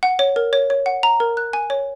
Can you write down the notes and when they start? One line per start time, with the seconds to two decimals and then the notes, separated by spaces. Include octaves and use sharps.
0.03 F#5
0.19 C#5
0.36 A#4
0.53 C#5
0.70 C#5
0.86 F#5
1.03 A#5
1.20 A#4
1.37 F#6
1.53 G#5
1.70 C#5